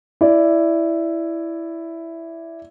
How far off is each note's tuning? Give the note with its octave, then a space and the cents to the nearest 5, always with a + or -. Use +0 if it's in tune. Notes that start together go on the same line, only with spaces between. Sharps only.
E4 +5 D5 +0